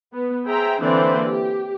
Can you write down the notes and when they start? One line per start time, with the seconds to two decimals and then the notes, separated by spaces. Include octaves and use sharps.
0.13 B3
0.46 G#4 C5 E5 G5 A#5
0.80 D3 E3 A#3 C4 C5 D5
1.26 G4